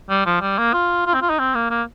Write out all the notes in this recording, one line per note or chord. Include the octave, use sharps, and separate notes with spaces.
G3
F3
G3
A#3
F4
F4
C4
F4
D#4
C4
A#3
A#3